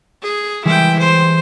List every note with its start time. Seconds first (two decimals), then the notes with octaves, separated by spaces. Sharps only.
0.22 G#4
0.65 E3 G3 G#3 E4 G5
0.99 C5